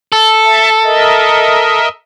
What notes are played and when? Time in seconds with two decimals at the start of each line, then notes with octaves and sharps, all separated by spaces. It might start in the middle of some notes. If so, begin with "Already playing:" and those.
0.12 A4
0.44 E5 A5
0.84 A#4 D#5 E5